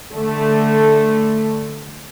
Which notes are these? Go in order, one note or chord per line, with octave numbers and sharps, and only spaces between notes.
D3 A3